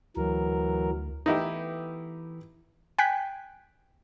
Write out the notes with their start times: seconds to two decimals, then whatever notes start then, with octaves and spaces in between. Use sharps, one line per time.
0.17 D2 E3 F#3 A#4
1.26 E3 A3 B3 D#4 E4 G4
2.98 G5 G#5 F#6 B6